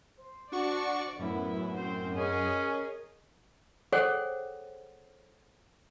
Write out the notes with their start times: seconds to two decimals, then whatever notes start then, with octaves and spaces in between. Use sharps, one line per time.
0.17 C5
0.52 D4 F#4 D5 C#6
1.19 F#2 A2 B3 E4
1.77 C4 C5
2.16 C#4 G#4 A#4 D#5
3.92 G#4 A4 C5 C#5 F#5 G5